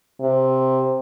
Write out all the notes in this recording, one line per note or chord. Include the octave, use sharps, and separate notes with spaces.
C3